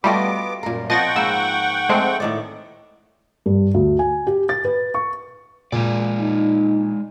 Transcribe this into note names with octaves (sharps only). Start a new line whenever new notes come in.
G3 A3 B3 F4 F#4 D#5 D6
F#2 A#2 A#4
F3 C4 D#5 F#5 G5 C#6 A6 A#6
G#2 A#3 B4 E6
G#3 A3 C4
A2 D#3 D5
G2
D2
G#5
G4
A6
B4
C#6
A#2 G#3 D4 D5
D#4